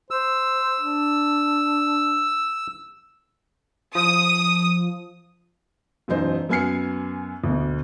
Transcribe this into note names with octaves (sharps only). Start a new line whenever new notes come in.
C5 E6
D4
F3 D#6
E1 F#2 D#4 C5
F#2 B3 G#5 F6 C7 C#7
D2 B2